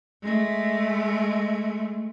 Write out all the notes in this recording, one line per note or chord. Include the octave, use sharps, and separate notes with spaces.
G#3 A3